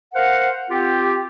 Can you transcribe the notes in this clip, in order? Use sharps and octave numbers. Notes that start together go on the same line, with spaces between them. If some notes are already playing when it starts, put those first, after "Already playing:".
A#4 C5 F5 F#5
C4 F4 G4